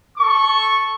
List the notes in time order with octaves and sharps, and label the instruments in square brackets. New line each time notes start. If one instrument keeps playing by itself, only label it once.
[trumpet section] A4 C#6